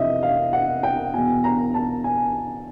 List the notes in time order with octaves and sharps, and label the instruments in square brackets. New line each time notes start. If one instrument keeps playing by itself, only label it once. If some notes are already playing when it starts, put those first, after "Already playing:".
Already playing: [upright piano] F2 C3 E3 D#5 E5
F5
F#5
G5
E2 B2 G#5
A#5
A5
G#5